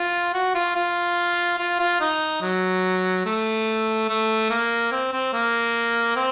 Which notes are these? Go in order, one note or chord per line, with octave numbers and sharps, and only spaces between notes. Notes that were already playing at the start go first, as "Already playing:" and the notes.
Already playing: F4
F#4
F4
F4
F4
F4
D#4
F#3
A3
A3
A#3
C4
C4
A#3
C4